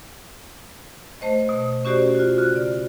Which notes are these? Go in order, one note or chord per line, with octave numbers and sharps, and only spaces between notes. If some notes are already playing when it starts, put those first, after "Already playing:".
A3 C5 D#5
B2
C#4 F#4 G4 C5 D5
F4 F#4
C#3 F#6
D5